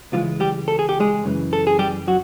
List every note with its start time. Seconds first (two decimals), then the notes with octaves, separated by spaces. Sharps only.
0.12 C#2 C#3 E3 F3 G#3 F4
0.40 G3 G4
0.68 A4
0.79 G#4
0.89 G4
1.00 G#3 G#4
1.24 F#2 C#3 E3
1.53 A4
1.67 G#4
1.79 G3 G4
2.07 F#3 F#4